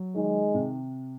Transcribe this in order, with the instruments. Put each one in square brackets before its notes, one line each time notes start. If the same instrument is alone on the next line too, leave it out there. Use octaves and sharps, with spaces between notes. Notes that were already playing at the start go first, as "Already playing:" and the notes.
Already playing: [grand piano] F#3
[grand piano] D#3 [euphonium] G#3
[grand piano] C3